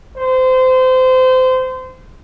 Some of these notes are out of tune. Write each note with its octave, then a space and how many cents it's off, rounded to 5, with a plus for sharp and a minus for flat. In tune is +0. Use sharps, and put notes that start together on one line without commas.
C5 -25